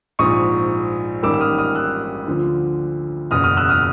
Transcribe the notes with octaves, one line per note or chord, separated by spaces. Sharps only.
A#1 G#2 F3 C#6 D#6
A1 G#2 D#3 G3 A#3 D6 E6
E6
D#6 F6
D#6 F6
E6 F#6
D2 D3 F3
F#1 E2 B2 D#6 F6
D#6 F6
E6 F#6
D#6 F6